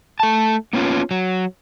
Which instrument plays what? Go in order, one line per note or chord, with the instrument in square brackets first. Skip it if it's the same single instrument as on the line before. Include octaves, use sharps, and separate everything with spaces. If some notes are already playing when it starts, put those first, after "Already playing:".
[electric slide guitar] A3 A5
A#3 B3 C#4 E4 F4
F#3